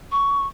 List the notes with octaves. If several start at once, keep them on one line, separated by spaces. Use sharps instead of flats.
C#6